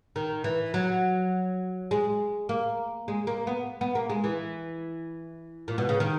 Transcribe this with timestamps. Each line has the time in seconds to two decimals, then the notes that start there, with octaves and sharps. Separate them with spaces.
0.16 D#3
0.44 E3
0.74 F#3
1.91 G#3
2.49 A#3
3.08 G#3
3.27 A#3
3.47 B3
3.81 B3
3.95 A#3
4.10 G#3
4.24 E3
5.68 A#2
5.78 B2
5.89 C#3
6.00 D#3